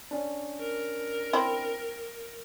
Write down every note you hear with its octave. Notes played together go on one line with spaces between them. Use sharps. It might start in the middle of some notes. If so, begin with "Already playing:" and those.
C#4 D4
A#4
C4 E4